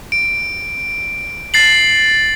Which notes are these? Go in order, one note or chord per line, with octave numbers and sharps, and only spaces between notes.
D7
A6 C7 F#7